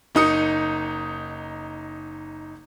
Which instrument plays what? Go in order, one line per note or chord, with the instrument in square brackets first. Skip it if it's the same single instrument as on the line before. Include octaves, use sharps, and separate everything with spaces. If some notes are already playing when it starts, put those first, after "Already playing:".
[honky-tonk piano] F#1 D#4 D#6 C#7